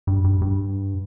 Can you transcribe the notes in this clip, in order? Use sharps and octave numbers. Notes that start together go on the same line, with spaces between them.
G2
G2
G2